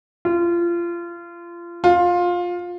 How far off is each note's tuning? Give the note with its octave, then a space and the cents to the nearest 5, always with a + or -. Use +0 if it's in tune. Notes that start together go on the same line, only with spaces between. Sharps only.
F4 -25
F4 +15